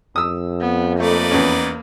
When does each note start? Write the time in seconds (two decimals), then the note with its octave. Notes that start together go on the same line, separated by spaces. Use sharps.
0.16 F2 D#6 E6
0.61 B3
1.00 A3 A#3 D#4 B4 D5
1.31 E2 C#4